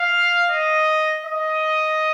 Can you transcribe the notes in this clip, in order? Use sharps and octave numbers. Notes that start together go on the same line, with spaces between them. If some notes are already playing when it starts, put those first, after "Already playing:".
Already playing: F5
D#5
D#5